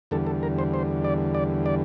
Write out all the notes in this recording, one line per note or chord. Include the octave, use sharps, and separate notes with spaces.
E2 D3 G3 A4
A4
A#4
C5
C5
D5
D5
D5